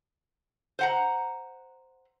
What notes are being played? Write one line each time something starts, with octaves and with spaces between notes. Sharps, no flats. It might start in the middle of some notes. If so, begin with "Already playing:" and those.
C5 F#5 A#5